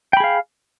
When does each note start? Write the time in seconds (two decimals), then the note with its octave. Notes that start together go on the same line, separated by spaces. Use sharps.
0.13 G5
0.17 B5
0.20 G#4
0.24 F5